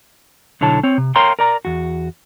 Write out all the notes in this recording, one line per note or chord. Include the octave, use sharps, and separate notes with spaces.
B1 D3 E4 C#5 A5
C4 C#5
C3
A#4 C#5 F5 G5 A#5 C6
A#4 D5 A#5
E2 F#4